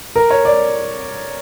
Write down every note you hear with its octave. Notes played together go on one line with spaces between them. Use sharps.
A#4
C#5
D5